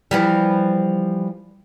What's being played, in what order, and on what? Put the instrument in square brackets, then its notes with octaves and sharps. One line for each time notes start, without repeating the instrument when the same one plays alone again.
[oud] E3 F3 G3